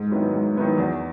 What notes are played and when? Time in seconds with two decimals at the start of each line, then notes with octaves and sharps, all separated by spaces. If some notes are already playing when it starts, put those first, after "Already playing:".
Already playing: G#2
0.11 D#3 F#3 B3 E4
0.34 G#2
0.56 D#3 F#3 B3 E4
0.78 E2